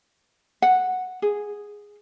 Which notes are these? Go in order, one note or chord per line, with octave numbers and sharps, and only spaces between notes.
F#5
G#4